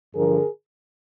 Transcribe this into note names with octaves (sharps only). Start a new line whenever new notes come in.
G2 D3 F3 G#4 A#4